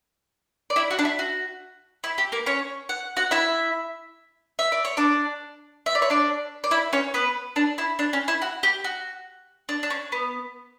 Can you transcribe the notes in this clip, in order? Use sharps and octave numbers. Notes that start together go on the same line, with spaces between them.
D5
E4 E5
F#4
D4
E4
F#4
E4
G4
A#3 A#4
C#4 C#5
F#5
F#4 F#5
E4 E5
E5
D5
C#5
D4 D5
E5
D5
C#5
D4 D5
D5
E4 E5
C#4 C#5
B3 B4
D4
E4
D4
C#4
E4
F#4
G4
F#4
D4
D4
C#4
B3